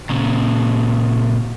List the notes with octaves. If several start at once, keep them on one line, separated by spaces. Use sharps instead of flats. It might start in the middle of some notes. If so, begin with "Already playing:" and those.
A#2 C#3